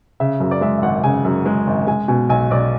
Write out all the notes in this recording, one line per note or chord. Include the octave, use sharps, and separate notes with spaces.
C#3 E5
F#2
D5
G#3 E5
E5
G#1 F#5
C#3 G#5
F#2
G#3
G#1
G#3 G#5
B2 G#5
B1 G#5
B1 D5